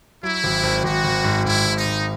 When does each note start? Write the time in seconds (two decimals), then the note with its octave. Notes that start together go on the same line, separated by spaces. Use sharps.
0.23 F#3 E4
0.44 G#1
0.63 G#1
0.84 G#1 F#4
1.04 G#1
1.24 G#2
1.44 G#2 E4
1.65 G#1
1.76 D#4
1.85 G#1